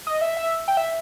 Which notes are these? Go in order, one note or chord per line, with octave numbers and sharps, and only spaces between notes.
D#5
E5
E5
G5
E5